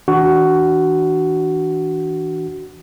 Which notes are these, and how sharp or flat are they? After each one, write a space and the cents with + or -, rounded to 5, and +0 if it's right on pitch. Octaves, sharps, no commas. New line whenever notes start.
E3 -35 D4 +0 F#4 +15